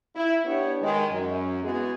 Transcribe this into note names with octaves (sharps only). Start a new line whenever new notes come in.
E4
B3 D4 G4 C#5
D#3 G#3
F#2
G#3 B3 E4 F#4 G#4